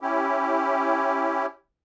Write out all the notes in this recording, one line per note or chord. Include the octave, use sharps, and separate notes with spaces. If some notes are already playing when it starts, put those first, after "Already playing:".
C#4 E4 G4